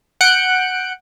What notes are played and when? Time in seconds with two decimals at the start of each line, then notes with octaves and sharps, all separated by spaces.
0.21 F#5 F#6 G6 C#7 D7